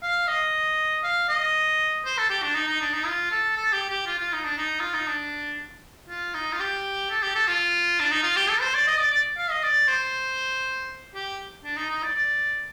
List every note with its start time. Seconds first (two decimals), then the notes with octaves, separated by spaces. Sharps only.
0.02 F5
0.27 D#5
1.03 F5
1.29 D#5
2.05 C5
2.18 A4
2.30 G4
2.42 D4
2.55 D#4
2.68 D#4
2.81 D4
2.93 D#4
3.06 F4
3.31 A4
3.56 A4
3.72 G4
3.90 G4
4.06 F4
4.19 F4
4.32 D#4
4.44 D4
4.57 D#4
4.80 F4
4.94 D#4
5.07 D4
6.09 F4
6.34 D#4
6.52 F4
6.60 G4
7.10 A4
7.22 G4
7.35 A4
7.48 F4
8.00 D4
8.11 D#4
8.23 F4
8.36 G4
8.50 A4
8.61 C5
8.74 D5
8.87 D#5
8.99 D5
9.12 D5
9.37 F5
9.50 D#5
9.63 D5
9.88 C5
11.15 G4
11.64 D4
11.77 D#4
11.90 D#4
12.03 D5
12.15 D5